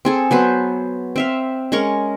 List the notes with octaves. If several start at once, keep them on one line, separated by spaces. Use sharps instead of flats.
C4 G#4 A4
F#3 B3 B4 C5
C4 E5 F5
G#3 C#4 A#4 C#6